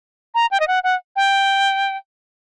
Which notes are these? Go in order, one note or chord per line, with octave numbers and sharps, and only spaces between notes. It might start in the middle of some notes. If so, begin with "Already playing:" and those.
A#5
G5
D#5
F#5
F#5
G5